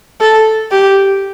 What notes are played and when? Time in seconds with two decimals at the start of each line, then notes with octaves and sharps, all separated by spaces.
0.21 A4
0.71 G4